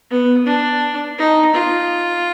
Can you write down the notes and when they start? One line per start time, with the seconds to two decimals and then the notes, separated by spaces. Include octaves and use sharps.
0.10 B3
0.46 D4
1.18 D#4
1.54 F4